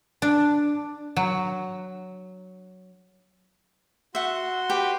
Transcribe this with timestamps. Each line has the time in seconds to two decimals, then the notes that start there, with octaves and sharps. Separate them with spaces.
0.22 D4
1.17 F#3
4.15 F#4 E5 F#5 C6
4.70 G4 B4